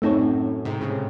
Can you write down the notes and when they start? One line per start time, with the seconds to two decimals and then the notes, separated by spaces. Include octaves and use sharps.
0.02 F#2 A2 A3 C4 D#4 A4 C#5
0.65 G#2 C3
0.81 A2 C#3